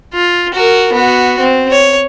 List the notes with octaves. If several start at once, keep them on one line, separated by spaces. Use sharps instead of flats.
F4
F#4 A#4
B3 F#4
C4
C#5